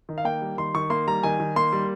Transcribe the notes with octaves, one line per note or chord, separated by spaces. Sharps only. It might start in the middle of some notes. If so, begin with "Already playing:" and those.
D#3
F5
A#3 G5
G3
D#3 C6
D#3 C#6
A#3 C6
G3 A#5
D#3 G#5
D#3
A#3 C6
G3